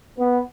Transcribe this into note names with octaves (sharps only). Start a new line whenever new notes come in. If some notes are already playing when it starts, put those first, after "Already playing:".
B3